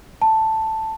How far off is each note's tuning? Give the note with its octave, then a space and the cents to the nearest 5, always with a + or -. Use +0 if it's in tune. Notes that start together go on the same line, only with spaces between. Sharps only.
A5 +5